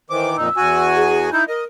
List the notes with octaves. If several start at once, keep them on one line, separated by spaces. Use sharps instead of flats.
D#3 E3 C5 D6
F2 A#2 D#4 E6
E2 F#4 G#5
G#4
D#4 E4 G6
A#4 D#5